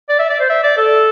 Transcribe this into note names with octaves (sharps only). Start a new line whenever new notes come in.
D5
E5
D5
C5
E5
D5
A4